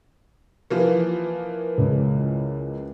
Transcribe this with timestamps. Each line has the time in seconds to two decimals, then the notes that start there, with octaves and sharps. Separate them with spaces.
0.70 E3 F3 A#3
1.78 C#2